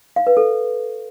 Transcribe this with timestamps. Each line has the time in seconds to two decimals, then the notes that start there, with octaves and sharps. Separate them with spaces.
0.16 F5
0.27 B4
0.37 A4